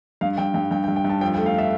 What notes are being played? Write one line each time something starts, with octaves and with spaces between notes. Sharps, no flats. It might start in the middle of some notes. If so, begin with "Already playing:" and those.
G2 F5
G2 G5
G2 G5
G2 G5
G5
G2
G5
G2 A5
F2 G5
G5
A3
F5
E5